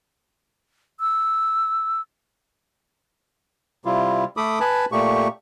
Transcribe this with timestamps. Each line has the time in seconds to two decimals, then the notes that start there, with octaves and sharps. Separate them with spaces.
1.00 E6
3.85 C3 G3 E4 F4
4.37 A3 A4 B5 D6 D#6
4.60 B4 G#5 A5 B5
4.92 A#2 A3 G4 C#6